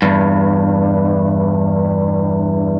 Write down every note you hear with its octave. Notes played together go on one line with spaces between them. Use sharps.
E2 G2